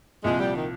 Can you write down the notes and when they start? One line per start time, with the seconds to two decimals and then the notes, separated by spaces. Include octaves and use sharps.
0.24 C2 A#2 F3 G#3
0.39 G3
0.55 D#3